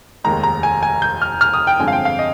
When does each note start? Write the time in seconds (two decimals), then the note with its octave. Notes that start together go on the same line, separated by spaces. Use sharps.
0.24 F1 D#2 D#3 G#3 A#5
0.43 A#5
0.63 G#5
0.83 G#5
1.02 G6
1.22 F6
1.41 F6
1.53 D#6
1.67 G5
1.79 G1 F2 D3 G#3 C4 G#5
1.88 F5
1.92 G5
2.05 F5
2.19 D#5